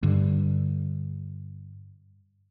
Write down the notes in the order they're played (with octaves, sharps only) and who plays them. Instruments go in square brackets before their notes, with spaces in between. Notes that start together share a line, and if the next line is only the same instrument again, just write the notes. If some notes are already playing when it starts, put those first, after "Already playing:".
[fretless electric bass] G2 D3